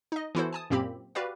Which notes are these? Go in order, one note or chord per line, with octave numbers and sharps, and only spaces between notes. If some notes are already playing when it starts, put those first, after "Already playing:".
D#4 D#5
E3 B3 E4 F#4 A4 C5
G#5 A5 D#6
F#2 A#2 A#3 C4 G4 B5
F#4 G4 B4 D5 F5